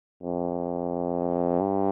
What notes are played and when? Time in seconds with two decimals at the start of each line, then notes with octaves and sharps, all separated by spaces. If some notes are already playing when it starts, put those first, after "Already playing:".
0.23 F2
1.61 G2